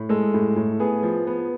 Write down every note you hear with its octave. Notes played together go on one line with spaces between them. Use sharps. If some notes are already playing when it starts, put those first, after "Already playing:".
Already playing: A2
G#3 A4
A2
A2
B3 G#4
F3
B3